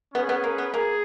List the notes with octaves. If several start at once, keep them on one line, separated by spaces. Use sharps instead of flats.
B3 C#4 G#4 B4
B3
A#3
B3
A#3 G#4